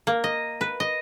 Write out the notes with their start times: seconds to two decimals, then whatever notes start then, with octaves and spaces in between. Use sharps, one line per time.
0.07 A#3
0.24 D#5
0.61 B4
0.80 D#5